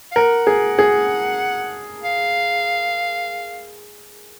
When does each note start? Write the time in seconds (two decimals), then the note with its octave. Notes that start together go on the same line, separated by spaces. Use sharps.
0.12 F5
0.15 A#4 F#5
0.47 G#4
0.79 G#4
2.03 F5